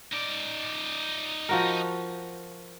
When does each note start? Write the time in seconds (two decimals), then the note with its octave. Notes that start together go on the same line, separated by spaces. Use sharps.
0.12 D#4 D5
1.49 F3 F#4 A#4